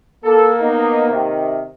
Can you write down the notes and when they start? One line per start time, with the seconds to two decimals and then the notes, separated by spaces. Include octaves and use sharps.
0.24 A#3 A4
0.60 B3 D#4
1.07 C3 D#3